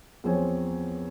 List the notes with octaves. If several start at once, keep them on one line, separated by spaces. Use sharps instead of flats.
E2 F3 C4 C#5 G#5